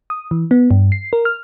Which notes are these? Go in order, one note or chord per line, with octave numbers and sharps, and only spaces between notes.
D#6
E3
B3
G2
C7
A#4
F6